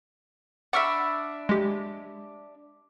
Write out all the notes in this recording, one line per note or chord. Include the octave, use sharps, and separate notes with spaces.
D4 E5 F#5 B5 C#6 F6
G#3 G4